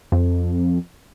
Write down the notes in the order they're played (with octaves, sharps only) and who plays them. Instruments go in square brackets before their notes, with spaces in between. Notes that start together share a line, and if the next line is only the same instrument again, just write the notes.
[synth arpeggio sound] F2